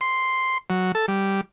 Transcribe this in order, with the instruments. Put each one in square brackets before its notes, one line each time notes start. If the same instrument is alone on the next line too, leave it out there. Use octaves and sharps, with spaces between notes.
[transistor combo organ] C6
F#3
A4
G3